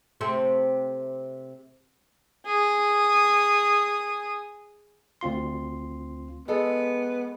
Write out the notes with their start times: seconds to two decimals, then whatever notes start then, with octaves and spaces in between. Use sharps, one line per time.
0.21 C3 A3 C4
2.45 G#4 D#6
5.21 D2 C4 F4 C6
6.48 G#3 B3 A4